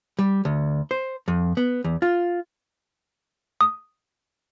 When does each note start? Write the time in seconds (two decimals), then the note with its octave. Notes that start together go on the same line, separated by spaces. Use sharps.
0.19 G3
0.45 D2
0.91 C5
1.28 F2
1.57 B3
1.84 E2
2.02 F4
3.61 D#6